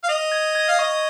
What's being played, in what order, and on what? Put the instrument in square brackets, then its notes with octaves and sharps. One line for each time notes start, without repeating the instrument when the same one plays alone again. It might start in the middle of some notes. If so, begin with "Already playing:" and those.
[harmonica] F5
[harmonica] D#5 [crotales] F7
[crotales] G#6
G#6
[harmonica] F5
[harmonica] D#5 [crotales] C#6